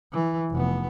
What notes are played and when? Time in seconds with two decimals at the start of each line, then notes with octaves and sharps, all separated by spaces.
0.13 E3
0.51 F1 B3